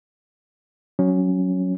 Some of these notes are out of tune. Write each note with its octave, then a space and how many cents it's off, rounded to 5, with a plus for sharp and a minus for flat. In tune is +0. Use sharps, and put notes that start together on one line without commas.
F#3 +0 C#4 +0